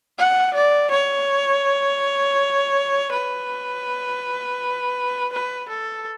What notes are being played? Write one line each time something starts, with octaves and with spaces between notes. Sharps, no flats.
F#5
D5
C#5
B4
B4
A4